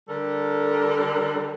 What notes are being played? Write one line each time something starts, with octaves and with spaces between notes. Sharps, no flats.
D3 G3 A4 A#4